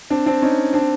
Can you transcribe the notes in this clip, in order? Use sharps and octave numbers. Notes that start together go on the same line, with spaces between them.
C4 D4
C4 D4
C#4 D#4
C4 D4